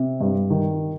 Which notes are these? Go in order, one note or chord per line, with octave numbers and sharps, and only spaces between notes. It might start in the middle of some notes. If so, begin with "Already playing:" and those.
Already playing: C3
G2
D#3